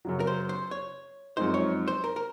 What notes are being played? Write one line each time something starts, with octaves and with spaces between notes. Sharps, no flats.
F#2 C#3 F#3
A#4
C5
C5
C#5
F#2 F3 G#3 C4 D#4 C5
C#5
C5
A#4
A#4